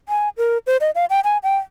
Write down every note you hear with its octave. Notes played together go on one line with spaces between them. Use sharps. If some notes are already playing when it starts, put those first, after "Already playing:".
G#5
A#4
C5
D#5
F5
G5
G#5
G5